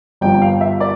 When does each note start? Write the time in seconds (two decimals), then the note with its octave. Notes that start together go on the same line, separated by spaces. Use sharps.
0.21 G1 G2 F3 G5
0.34 G5
0.42 F5
0.61 E5
0.80 D5